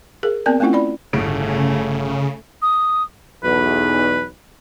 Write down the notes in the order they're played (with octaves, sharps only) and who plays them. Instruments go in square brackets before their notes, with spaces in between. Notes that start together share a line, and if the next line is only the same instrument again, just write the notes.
[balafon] G#4 A#4
B3 C4 A#4 D5 A5
A3 C4 C#4 E4 F4 F#5
E4 D5 B5
[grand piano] G1 A2 D7 [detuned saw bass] C#3 [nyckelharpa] A3 C#4
[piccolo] D#6
[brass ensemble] B1 E2 [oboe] B4